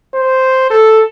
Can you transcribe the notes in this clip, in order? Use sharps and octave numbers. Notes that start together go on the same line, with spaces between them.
C5
A4